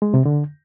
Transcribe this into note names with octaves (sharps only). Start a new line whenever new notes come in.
G#3
C3
D3